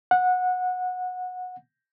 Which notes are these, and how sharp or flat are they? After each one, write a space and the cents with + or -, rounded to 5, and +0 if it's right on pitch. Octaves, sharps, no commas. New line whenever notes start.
F#5 -20